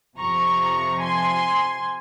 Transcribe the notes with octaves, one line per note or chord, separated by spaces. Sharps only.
F2 C3 F3 A#5 C#6
G#5 C6